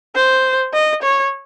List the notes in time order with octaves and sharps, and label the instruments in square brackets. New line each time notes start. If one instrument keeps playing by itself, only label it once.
[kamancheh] C5
D#5
C#5